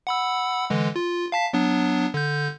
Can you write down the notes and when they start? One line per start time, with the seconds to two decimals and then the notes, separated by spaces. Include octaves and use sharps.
0.07 F#5 B5 E6
0.70 D3 E3 G#3
0.96 F4
1.32 F5 A5 B6
1.53 F#3 B3 D4
2.14 D3 G6